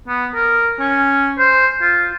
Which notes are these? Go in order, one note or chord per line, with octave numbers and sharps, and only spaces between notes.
B3
A#4
C#4
C5
F4